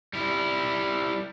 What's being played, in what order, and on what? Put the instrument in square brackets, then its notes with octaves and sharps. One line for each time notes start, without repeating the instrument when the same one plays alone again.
[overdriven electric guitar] G3 E4